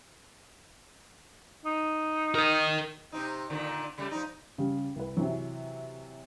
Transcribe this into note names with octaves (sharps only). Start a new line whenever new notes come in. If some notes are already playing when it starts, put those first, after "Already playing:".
D#4
A#4 D#5
C3 C4 D#4
A#2 D3 D#3
C#3 G3 A3
F3 D#4
C#3 G3
C2 B4
C3 E3 F#3